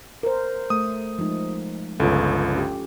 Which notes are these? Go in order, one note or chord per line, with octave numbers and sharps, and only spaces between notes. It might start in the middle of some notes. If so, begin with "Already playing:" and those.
A#4 C5
A3 D#6
F3 G#3 D#4
G1 C#2 F4 A4
C#4 G4